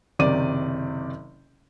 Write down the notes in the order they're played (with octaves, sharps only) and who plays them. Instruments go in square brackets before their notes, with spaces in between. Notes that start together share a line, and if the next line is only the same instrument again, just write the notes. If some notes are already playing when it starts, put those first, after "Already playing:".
[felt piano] F#1 C3 D#3 D5 D6 D#7